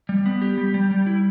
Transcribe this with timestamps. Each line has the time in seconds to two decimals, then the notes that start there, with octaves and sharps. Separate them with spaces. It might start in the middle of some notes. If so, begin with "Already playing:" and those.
0.09 G3
0.26 B3
0.42 G4
0.58 G3
0.74 G3
0.91 G3
1.06 E4